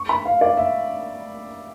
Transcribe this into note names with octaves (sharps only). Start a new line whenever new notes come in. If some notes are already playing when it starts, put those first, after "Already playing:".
Already playing: C#6
B5
F5
D5
E5